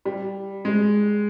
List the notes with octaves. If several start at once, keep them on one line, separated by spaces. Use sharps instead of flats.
G3
G#3